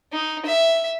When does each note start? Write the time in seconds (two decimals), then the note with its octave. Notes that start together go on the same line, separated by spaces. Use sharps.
0.12 D#4
0.45 E5